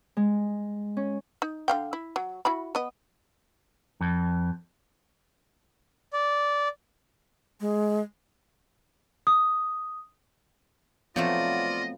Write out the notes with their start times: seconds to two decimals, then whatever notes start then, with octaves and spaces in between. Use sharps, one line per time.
0.17 G#3
0.97 C#4
1.42 D#4
1.68 D3 F5 G5
1.93 E4
2.16 F#3
2.45 E4 F#4 B5
2.75 B3 D#5
4.01 F2
6.13 D5
7.60 G#3
9.27 D#6
11.16 F3 F#3 A3 B3 C4 F4 D5 D#5